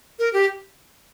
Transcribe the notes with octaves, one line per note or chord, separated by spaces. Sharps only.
A#4
G4